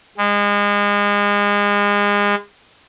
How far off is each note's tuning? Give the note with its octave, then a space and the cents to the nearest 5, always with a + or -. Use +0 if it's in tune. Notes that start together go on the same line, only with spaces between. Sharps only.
G#3 -30